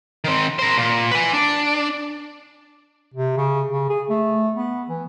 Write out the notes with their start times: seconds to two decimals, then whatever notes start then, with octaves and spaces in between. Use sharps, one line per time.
0.24 D#3 C4
0.59 A#4 C5
0.78 A#2
1.11 B4 G#5
1.33 D4
3.14 C3
3.37 C#3
3.71 C#3
3.90 G#4
4.09 A3
4.56 B3
4.89 E3